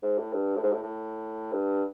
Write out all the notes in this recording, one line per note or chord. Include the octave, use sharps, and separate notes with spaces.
G#2
A2
G2
A2
G#2
A2
A2
G2